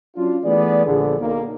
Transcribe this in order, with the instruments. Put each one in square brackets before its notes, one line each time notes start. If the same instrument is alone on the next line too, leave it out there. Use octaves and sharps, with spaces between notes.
[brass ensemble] F#3 C#4 D4 F4
E3 A3 B3 G#4 D5
A#1 D3 G#4
B1 A#3